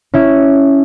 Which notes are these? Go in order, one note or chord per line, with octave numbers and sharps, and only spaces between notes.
C#4 E4